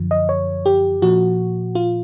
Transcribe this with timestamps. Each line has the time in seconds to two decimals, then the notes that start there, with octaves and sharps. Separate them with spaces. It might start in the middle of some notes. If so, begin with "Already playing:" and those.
Already playing: F#2 D3 F3
0.11 D#5
0.29 C#5
0.66 G4
1.02 A#2 F3 F#4
1.75 F4